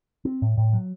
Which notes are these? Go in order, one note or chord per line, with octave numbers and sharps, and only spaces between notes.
C4
A2
A2
F#3